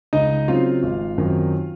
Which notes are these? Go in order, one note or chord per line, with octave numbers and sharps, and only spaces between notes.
C#2 D#4 D#5
C#3 F#3 C4 F4 F5
G#1
F#2 D#3 F#3 C4